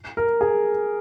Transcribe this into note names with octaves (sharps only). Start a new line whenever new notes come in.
A#4
G#4